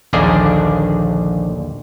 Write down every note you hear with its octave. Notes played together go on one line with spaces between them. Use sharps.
A#1 D#2 D3 A#3 D4 G#4